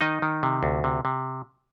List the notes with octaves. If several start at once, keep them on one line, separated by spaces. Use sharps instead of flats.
D#3 D#4 D#5
D#3
C3
D2
C3
C3